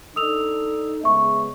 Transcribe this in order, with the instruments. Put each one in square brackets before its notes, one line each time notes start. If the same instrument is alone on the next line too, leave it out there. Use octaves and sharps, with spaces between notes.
[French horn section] D4 D#4 A4 [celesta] D#6 E6 F7
[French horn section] C#3 G#3 B3 [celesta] E5 C#6